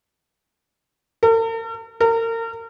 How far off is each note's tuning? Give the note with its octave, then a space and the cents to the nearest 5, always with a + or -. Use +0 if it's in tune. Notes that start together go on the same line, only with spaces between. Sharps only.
A#4 -45
A#4 -30